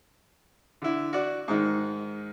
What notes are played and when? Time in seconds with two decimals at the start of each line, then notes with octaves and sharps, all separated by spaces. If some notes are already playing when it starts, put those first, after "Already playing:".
0.82 D3 E4
1.13 F#4 D5
1.48 G#2 D#3